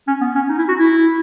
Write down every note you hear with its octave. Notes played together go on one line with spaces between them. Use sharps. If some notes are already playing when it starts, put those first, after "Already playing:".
C#4
B3
C#4
D#4
E4
F#4
E4